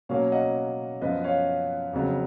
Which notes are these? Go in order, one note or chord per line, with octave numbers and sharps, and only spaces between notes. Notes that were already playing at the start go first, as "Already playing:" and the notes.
B2 F#3 A#3 C#4 C#5 F5
D#5 F#5
F#2 F3 B3 B4 D#5
C#5 F5
F2 C#3 F#3 B3